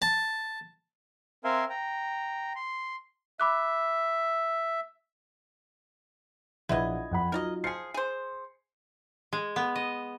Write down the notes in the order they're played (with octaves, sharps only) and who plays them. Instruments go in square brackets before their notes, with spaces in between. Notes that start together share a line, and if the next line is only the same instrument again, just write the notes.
[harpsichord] A5
[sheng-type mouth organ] C4 A#4 E5 F5 G#5 C6
G5 A#5
C6
[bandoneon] E5 [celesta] B5 D6 F#6
[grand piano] A#1 F#5 G#6 [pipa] E4 B4 D#5
[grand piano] F2 F#5 B5
[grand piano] F#3 D#4 F4 [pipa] A#4 D5 D#5
[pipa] F3 G#4 [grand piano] F6 C7 C#7
[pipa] G#4 C5
[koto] G#3
B3
D#5